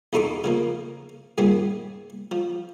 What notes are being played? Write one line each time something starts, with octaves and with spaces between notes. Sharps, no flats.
E2 B2 D#4 A4 C6 D6
C#3 F3 A#3
G2 A#2 D#3 G#3 C4
F3